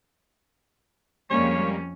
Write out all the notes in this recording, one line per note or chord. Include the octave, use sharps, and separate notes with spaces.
F2 G3 G#3 A#3 C#4 C#5